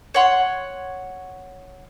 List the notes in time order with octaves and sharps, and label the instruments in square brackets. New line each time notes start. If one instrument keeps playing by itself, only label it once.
[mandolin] C#5 F#5 C6